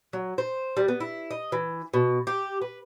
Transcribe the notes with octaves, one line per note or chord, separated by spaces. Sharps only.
F#3
C5
G3
B3
E4
D#5
E3
B2
G4
B4